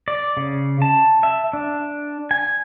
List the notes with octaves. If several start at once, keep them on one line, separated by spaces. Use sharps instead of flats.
D5
C#3
A5
E5
D4
G#5